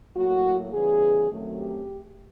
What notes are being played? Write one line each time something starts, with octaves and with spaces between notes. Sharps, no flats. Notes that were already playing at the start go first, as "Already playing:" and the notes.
A2 F#3 A#3 F#4
C#3 E3 G3 B3 G#4
F#2 D#3 F#3 A3 C4
G4